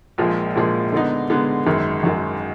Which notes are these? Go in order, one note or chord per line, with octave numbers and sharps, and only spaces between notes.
A#1 A#2 F3 G#3
A#1 A#2 F3 G#3
D3 G#3 B3 D#4
D3 G#3 B3 D#4
G#1 F#2 D#3 G#3
G#1 F#2 D#3 G#3